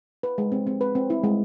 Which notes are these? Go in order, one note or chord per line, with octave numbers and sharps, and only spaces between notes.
B4
G#3
C4
C4
B4
C4
E4
G#3